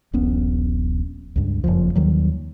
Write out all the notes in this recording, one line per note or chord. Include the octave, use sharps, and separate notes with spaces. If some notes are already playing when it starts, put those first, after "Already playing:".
D#1 A#1 B3 C#4
C#2 G2
F#1 B1 F2 F3
D#2 D#3 F#3 G3